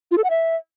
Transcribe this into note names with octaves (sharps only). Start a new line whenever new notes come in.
F4
A4
F#5
E5